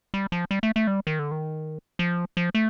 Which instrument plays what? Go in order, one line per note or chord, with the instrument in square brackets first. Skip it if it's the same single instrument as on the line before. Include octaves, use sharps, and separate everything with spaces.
[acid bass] G3
F3
G3
A3
A3
G3
D#3
D3
D#3
F3
F3
A3